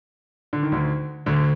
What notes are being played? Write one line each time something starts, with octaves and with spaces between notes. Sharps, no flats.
D3
D#3
D2 D3
D2 D3